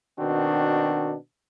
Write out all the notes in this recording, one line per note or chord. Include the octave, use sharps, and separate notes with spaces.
B2 D#3 C4 D4 F#4